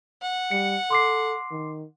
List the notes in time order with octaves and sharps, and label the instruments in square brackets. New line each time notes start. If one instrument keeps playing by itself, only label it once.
[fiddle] F#5
[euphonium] G3 [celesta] C#7
[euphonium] A4 [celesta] C6 D6 C7
[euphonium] D#3